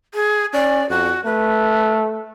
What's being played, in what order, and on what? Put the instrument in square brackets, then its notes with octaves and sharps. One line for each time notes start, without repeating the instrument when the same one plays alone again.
[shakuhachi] G#4
[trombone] C#4 [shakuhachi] D5
[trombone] F2 [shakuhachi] F#4
[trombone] A3 [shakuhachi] B4